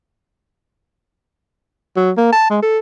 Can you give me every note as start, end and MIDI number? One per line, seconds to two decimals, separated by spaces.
1.96 2.11 54
2.17 2.29 58
2.32 2.46 81
2.50 2.60 56
2.63 2.78 69